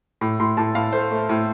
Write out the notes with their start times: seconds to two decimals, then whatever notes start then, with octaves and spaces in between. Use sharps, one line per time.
0.21 A2
0.40 A2 C6
0.57 A2 A5
0.75 A2 F5
0.92 A3 C5
1.11 A3
1.29 A2